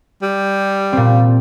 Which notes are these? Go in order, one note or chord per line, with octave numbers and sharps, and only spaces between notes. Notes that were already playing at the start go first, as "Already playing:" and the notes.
G3
A#2 C4